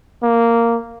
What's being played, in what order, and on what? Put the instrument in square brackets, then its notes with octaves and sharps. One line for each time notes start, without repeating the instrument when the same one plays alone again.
[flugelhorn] A#3